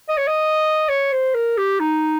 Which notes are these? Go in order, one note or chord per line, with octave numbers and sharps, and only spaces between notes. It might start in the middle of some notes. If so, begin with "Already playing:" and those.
D#5
C#5
D#5
C#5
C5
A#4
G4
D#4